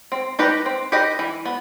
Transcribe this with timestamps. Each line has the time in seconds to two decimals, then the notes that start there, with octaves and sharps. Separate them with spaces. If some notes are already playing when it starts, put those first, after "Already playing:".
0.12 C4
0.39 D#4 G4 B4 D#5
0.66 C4
0.92 D#4 G4 B4 D#5
1.19 E3
1.45 B3